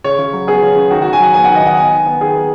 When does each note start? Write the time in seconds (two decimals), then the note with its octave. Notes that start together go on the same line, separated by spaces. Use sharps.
0.04 C#3 C#5
0.19 C#3
0.33 F#3
0.47 B3 G#4
0.62 C#3
0.76 C#3
0.91 D#3 F#4
1.02 F#4
1.05 D#3
1.13 G#5
1.19 F#3 F#5
1.34 B3 G#5
1.44 F#5
1.49 D#3
1.55 D#5
1.63 D#3 F#5
1.77 B3 G#5
1.92 D#3
2.06 B3
2.21 D#3 G#4
2.34 B3